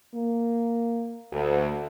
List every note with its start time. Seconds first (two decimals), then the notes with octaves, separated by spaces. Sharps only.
0.15 A#3
1.32 D2